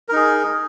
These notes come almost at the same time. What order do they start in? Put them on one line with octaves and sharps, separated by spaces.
A#4 D#4 G#4